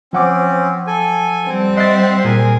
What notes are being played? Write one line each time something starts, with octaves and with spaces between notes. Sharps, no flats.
F3 C4 C#4 F#5 D6
A4 G#5
G3 C4
D#5 E5 F#5 C6 A6
A#2 G#4 A#4 G#5